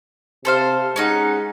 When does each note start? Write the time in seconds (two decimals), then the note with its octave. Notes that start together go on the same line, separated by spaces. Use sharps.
0.45 C3 A4 C5 F5
0.96 G#3 C#4 D#4 F#5